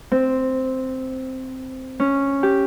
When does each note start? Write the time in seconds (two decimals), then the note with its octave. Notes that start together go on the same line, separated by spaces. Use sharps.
0.12 C4
2.00 C#4
2.43 G4